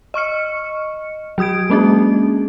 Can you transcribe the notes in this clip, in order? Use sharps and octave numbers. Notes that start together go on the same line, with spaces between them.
D#5 C#6 F6 C#7
F#3 F#4 D#6 G#6 D7
G#3 A#3 C#4 D4 G#4